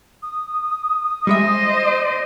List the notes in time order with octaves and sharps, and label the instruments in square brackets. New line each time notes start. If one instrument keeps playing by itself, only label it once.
[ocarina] D#6
[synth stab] G3 G#3 E5 [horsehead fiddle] C5 D#5